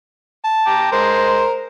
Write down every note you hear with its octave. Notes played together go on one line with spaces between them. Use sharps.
A5
G5 A#5 D6
G#3 A#4 C5